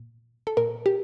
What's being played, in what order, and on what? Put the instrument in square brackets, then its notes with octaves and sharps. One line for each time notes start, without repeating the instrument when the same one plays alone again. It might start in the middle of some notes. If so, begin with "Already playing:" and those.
Already playing: [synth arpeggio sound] A#2
A4
A#2 A#4
G4